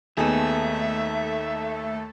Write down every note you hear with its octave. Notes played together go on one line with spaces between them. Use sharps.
D#2 A3 B3 D#4 G#4 A4 E5